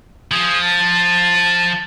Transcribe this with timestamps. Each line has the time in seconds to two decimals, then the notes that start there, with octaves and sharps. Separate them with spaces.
0.31 F3 G#4
0.61 A5